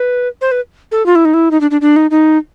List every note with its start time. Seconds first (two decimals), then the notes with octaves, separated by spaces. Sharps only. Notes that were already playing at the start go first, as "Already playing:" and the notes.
Already playing: B4
0.41 C5
0.51 B4
0.91 A4
1.06 F4
1.15 E4
1.25 D#4
1.34 E4
1.51 D#4
1.61 D4
1.71 D4
1.81 D4
1.96 D#4
2.11 D#4